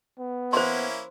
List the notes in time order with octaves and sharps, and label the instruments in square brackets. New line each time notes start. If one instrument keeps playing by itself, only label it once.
[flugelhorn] B3
[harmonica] A#3 C#4 E4 [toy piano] C5 C6